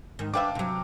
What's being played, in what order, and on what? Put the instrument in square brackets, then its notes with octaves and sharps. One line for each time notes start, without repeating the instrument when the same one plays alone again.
[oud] G#2 D#3
[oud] D4 B4 E5 [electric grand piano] F5 G5 D6
[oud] C3 F#3